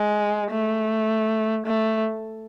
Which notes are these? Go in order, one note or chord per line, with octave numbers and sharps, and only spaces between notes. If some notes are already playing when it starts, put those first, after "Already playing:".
Already playing: G#3
A3
A3